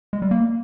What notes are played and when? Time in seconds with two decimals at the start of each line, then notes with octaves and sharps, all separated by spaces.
0.13 G#3
0.22 G3
0.31 A#3